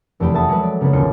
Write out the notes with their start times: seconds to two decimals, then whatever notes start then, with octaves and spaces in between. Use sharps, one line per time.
0.20 F1 E2 A3 G4 G5 B5
0.34 E5 F#5 G#5 A5 B5 D#6
0.48 F#3 G#3 G#4 A4 B4
0.63 D5
0.81 C#3 A#3 B3 D4 B4
0.93 D#1 A1 D2 F4 C#7